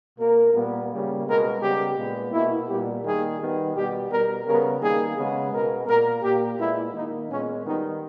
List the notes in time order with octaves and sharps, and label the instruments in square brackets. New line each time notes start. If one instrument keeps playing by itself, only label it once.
[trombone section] B2 A#3 A#4
A#2 G3 B3
C#3 G3 A#3
B2 G#3 B3 A#4
C#3 G3 B3 G4
A#2 G#3 B3
B2 A#3 E4
A#2 G3 B3 G4
D#3 G3 A#3 G#4
D#3 G3 B3
B2 G3 B3 G4
B2 G3 B3 A#4
C#3 G3 B3 A#4
D#3 G3 A#3 G#4
C#3 G#3 B3
B2 G#3 B3 A#4
A#2 A#3 A#4
A#2 A#3 G4
A#2 G#3 B3 E4
D#3 A#3 D#4
A#2 G#3 B3 C#4
D#3 G3 B3 D#4